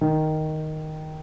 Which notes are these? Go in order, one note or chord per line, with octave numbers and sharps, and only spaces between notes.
D#3